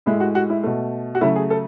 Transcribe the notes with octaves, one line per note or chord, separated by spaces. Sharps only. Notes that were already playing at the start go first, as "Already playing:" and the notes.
A2 G#3 E4
F#4
F#4
E4
B2 A3
F#4
C#3 F#3 A3 E4
G#4
A4